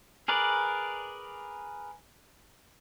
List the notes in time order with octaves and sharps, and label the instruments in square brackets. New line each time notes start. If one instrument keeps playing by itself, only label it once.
[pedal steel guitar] G#4 A#4 B4 D5